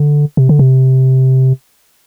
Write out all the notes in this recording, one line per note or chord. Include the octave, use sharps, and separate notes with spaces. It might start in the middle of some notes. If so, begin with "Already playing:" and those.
Already playing: D3
C3
D3
C3